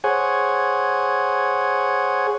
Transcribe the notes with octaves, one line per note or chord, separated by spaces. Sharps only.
G#4 C5 C#5 F#5 G#5